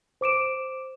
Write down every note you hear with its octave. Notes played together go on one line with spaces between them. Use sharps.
C5 D6 D7 E7